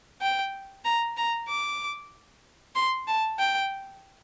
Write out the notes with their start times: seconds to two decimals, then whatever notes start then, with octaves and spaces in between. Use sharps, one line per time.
0.22 G5
0.85 A#5
1.17 A#5
1.49 D6
2.75 C6
3.08 A5
3.39 G5